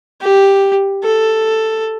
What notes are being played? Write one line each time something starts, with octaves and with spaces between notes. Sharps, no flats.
G4
A4